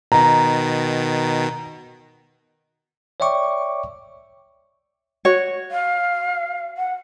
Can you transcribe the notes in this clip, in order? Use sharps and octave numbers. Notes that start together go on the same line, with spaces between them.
B2 D#3 A#5
C#5 D5 E5 G5 C#6 D6
F#4 C#5
F5
F#5